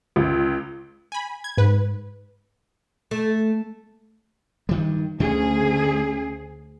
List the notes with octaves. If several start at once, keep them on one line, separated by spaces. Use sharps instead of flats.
C#2
G#5 B5
G#6
G#2 B4
A3
G2 D#3 G3
D2 C#3 C#4 G#4